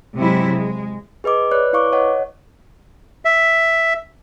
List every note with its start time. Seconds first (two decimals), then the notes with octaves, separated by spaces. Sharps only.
0.15 C3 F#3 G#3 E4
0.52 G#3
1.24 G#4 B4 D#5 D6
1.51 B4 C#5 D5 F#6
1.73 E4 B4 F5 C#6 D6
1.93 C#5 D#5 F#5
3.25 E5